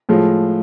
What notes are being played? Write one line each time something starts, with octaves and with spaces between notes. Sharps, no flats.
A2 F3 G#3